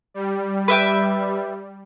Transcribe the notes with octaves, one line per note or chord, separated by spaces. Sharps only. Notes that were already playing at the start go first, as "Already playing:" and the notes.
G3
B4 E5 G5